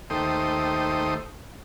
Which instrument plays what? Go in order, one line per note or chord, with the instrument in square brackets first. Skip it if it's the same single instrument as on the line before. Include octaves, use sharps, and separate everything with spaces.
[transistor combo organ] D#2 A3 G4 C5 D#6